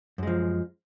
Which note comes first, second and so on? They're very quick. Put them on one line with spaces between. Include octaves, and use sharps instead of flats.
F#2 G#3 F3